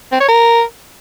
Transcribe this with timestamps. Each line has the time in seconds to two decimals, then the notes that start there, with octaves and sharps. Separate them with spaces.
0.12 C4
0.21 C#5
0.29 A#4